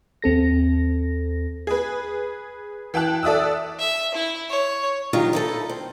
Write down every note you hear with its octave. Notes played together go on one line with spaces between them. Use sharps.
D#2 C4 A4 A#6
G#4 B4
E3 G5 A5 F#6
A4 D5 E5 D#6 E6
E5
E4
C#5
D#3 F#3 D#4 F4 G4
D#4 E4 A4
C4